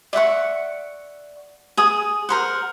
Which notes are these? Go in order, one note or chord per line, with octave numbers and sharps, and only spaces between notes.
D5 E5 F#5 C#6
G#4 D#6
A#4 C5 F#5